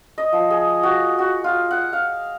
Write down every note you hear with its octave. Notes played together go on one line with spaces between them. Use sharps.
D#5
F3
G#4
F#4
F#4
F4
F#5
F5